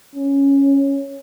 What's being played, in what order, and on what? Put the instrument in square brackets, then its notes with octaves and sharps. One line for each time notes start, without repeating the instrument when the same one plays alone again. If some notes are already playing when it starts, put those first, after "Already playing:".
[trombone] C#4